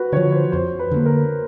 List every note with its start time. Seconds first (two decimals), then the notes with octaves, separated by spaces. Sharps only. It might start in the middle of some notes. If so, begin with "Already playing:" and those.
Already playing: F#4 B4
0.12 D3 F3 C#5
0.32 C5
0.52 F2 C5
0.79 B4
0.91 D3 F#3 A#3
1.05 A#4